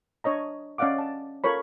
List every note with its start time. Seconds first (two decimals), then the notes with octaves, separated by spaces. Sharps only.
0.24 D4 C#5 D#5 A#5
0.78 C#4 D5 D#5 F5 F#5 D6
0.98 A5
1.44 F4 A4 A#4 C#5 B5